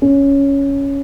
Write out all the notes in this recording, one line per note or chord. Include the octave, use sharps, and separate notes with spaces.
C#4